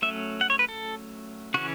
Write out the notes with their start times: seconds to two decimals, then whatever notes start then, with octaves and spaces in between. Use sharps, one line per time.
0.02 F#3 A3 C#4 E5
0.41 F#5
0.50 C#5
0.59 B4
0.69 A4
1.54 C#3 E3 C#4 F#4